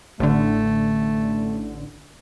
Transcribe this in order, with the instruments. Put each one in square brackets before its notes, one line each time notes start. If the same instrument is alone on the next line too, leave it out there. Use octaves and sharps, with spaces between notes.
[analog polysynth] A1 D3 [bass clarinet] A3